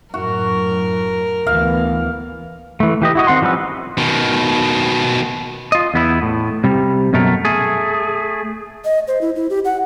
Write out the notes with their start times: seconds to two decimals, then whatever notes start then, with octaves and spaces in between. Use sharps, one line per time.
0.14 F#2 A2 F#4 A#4
1.47 D2 E3 B3 F5
2.80 E3 A3
3.02 E3 G4 D#5
3.15 E4 F#4 D#5
3.27 D#3 C4 F#5 C6
3.42 F3 G3 C#4 B4 E6
3.98 B2 D#3
5.72 F4 D#5
5.94 E2 B3 E4
6.22 A2
6.64 C3 G3
7.13 F#2 B2 A3 A#4
7.45 A3 G#4
8.85 D#5
9.08 C5
9.21 E4
9.36 E4
9.50 G4
9.65 F#5